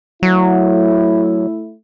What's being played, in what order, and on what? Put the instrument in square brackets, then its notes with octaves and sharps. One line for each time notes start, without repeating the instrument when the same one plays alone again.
[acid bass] F#3 [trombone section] A3 E4